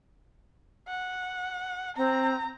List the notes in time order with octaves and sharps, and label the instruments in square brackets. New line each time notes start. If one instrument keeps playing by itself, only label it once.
[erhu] F#5
[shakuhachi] C4 [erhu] A#5